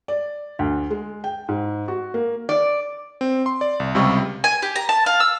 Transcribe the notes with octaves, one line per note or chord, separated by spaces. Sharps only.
D5
D2
G#3
G5
G#2
F#4
A#3
D5
C4
C6
D5
C2
C#2 C3 G3 C#6
G#5
G4
A#5
A5
F5
E6